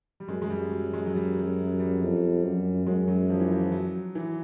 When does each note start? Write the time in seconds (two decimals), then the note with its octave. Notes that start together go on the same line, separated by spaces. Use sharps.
0.20 G3
0.28 F#2 G#3
0.42 G#3
0.50 G3
0.71 F#3
0.93 G#3
1.06 F#3
1.15 G3
1.37 F#3
1.79 G3
2.01 F2
2.43 F#2
2.86 F#2 G#3
3.08 F#3
3.30 F3
3.40 E3
3.51 F3
3.72 F#3
4.15 E3